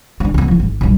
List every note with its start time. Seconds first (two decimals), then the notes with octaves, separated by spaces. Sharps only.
0.20 C4 D4
0.34 C#2 B3
0.48 F3 E4
0.59 G#1
0.81 B1 G2